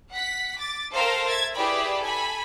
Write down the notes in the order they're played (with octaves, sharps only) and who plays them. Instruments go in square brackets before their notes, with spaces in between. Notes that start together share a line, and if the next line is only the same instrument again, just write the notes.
[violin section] F#5 B6
D6 A6
A4 A#4 C5 F5 G5 A#5
E5 G#6 A6
E4 G4 G#4 B4 D5 B5
A4 G#5 B5